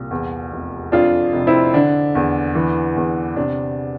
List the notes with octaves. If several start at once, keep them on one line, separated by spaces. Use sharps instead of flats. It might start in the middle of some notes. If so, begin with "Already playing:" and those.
Already playing: C2 A#2
E2
F1
F2 D4 F4
F1
C4 E4
D3 D4
E2
E3
E2
C3 D4